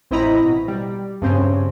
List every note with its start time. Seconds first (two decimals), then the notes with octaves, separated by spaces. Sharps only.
0.11 A1 C4 E4 D#5 A#5 B5
0.45 B2
0.68 G3
1.22 G2 C#3 C4 C#4